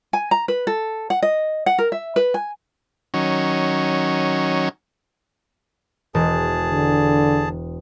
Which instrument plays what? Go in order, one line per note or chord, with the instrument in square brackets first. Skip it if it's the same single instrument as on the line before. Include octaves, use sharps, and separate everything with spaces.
[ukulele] G#5
A#5
B4
A4
F#5
D#5
F#5
A#4
E5
B4
G#5
[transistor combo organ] D#3 F#3 C#4
[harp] E1 A#5 [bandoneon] G#4 A5
[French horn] D3